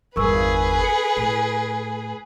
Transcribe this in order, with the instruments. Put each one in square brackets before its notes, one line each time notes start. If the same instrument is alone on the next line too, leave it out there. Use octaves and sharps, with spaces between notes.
[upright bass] G1 E2 [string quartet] G#4 B4 [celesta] A#4 C#6 E6
[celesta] A4 C#7 F#7
[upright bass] A2